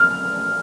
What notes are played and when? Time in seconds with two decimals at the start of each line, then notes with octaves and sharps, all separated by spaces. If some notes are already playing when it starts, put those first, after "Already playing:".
Already playing: F6